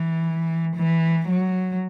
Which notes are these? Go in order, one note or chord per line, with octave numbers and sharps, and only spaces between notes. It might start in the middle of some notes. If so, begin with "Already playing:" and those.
Already playing: E3
E3
F#3